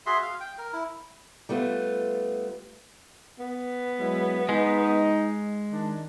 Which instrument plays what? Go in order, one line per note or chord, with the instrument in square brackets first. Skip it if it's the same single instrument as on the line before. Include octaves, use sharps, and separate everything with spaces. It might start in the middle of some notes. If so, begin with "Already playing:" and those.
[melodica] F#4 G#4 E5 C6
F5
G5
A#4
E4
[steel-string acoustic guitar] G3 A3 B3 F4
[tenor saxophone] B3
[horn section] F#3 G#3 E4
[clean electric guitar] G#3 [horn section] D#4
[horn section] D#3 D4